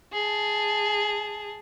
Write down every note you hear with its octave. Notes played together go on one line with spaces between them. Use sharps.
G#4 A5